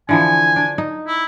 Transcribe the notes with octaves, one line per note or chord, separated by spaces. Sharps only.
D3 E3 F3 G#5
D4
D#4
E4